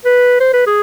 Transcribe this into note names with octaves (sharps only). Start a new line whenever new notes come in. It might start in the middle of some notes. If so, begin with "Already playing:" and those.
B4
C5
B4
G#4